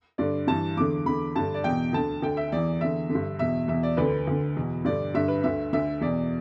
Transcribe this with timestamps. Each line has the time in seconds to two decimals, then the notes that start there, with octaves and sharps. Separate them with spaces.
0.18 G2 D3 D5
0.47 G2 E3 A5
0.77 E2 D3 D6
1.06 E2 D3 B5
1.36 G2 D3 A5
1.54 D5
1.64 E2 B2 G5
1.93 D2 D3 A5
2.22 D2 D3 G5
2.37 E5
2.52 E2 E3 D5
2.81 E2 D3 E5
3.10 D3
3.15 G2
3.39 E2 B2 E5
3.68 E2 B2 E5
3.83 D5
3.97 D2 D3 B4
4.27 D2 D3
4.56 E2 B2
4.84 G2 D3 D5
5.14 G2 D3 E5
5.28 B4
5.44 D2 D3 E5
5.73 D2 D3 E5
6.01 E2 B2 D5